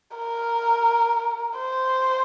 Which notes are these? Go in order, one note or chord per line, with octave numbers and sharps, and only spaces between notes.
A#4
C5